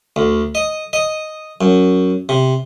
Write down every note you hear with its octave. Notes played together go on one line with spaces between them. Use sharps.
D2
D#5
D#5
F#2
C3